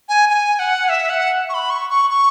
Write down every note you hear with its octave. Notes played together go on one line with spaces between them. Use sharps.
G#5
G#5
F#5
E5
F#5
C#6
B5
C#6
C#6
C#6